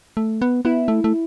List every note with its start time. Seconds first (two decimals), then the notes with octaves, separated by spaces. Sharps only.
0.17 A3
0.42 B3
0.65 B3 E4
0.88 A3
1.04 A3